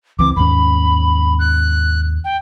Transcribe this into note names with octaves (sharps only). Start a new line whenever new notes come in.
C#2 E3 C4 D6
D#2 G#2 C#4 B5
F#6
G5